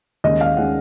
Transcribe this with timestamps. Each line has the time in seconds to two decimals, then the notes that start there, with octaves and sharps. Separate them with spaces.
0.24 D#2 D#3 G#3 C#4 D#5
0.41 F5
0.57 D#3 G#3 C#4 F#5